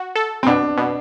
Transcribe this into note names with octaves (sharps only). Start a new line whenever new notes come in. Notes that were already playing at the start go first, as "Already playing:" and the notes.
Already playing: F#4
A4
C4
B2 D4
B2